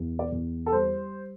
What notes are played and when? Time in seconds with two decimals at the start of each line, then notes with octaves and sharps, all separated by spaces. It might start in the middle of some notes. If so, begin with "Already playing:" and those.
Already playing: E2
0.19 D5
0.32 E2
0.66 A4
0.72 G3 C5